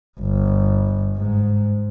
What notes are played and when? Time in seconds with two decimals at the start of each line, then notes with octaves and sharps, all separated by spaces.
0.20 G1
1.17 G#2